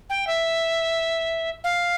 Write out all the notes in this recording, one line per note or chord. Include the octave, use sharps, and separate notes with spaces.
G5
E5
F5